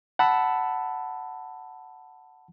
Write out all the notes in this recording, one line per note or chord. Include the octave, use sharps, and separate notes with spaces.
F#5 A5 B5 E6